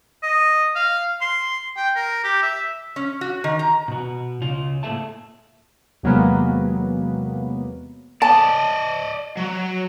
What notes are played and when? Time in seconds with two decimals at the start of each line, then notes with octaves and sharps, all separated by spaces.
0.23 D#5
0.76 F5
1.21 C6
1.77 G5
1.96 A#4
2.24 G4
2.43 E5
2.96 C#4
3.21 F#4
3.44 D#3
3.59 A#5
3.88 B2 F#4
4.41 C#3 F4
4.83 A2 A#3 G#4 A4 E5 A5
6.03 E2 C3 F#3 G#3 A#3 B3
8.22 D5 D#5 A5
9.37 F#3